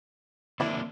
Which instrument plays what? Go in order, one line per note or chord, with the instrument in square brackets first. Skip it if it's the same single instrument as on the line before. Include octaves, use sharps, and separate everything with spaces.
[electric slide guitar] D#3 A#3 C4 [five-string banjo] D4 E4